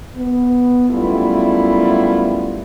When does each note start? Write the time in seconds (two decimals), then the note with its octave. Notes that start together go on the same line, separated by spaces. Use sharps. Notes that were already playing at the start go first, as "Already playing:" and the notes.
0.16 B3
0.90 F#2 G3 A3 B3 E4 F4